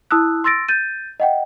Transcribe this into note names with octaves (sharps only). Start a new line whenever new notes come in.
E4 A5 D#6 E6 F#6
C6 E6 A6 A#6 D7
G6 A6 D#7
D#5 F#5 G5